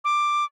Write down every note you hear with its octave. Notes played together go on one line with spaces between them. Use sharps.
D6